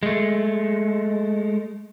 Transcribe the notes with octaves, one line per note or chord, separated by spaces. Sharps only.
G#3 A3